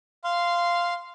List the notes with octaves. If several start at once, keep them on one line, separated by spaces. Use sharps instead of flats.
F5 C6